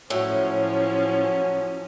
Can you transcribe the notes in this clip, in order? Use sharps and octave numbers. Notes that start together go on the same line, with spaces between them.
A2 F3 F#3 C#4